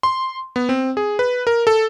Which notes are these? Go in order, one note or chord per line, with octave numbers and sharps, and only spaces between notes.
C6
B3
C4
G#4
B4
A#4
A4